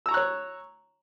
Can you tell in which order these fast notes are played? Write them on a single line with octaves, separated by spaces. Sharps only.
E6 A#5 C#6 F#6 C#5